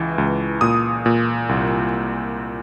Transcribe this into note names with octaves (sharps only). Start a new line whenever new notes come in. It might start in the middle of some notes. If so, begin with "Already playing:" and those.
Already playing: C#2 E3
C#2
A#2 D#6
A#2
C2